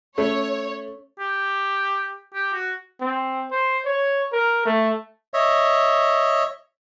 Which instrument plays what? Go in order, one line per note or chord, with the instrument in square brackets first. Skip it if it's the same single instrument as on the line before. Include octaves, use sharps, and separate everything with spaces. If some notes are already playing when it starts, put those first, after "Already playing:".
[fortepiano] A3 [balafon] C#4 [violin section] C#5
[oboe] G4
G4
F#4
[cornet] C4
C5
C#5
A#4
A3
[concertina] C#5 D#5 E5